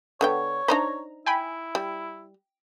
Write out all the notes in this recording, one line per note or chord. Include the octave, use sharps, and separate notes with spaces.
D3 B3 C#5 G5
D4 D#4 C5 A#5
E4 G5 G#5 B5
G3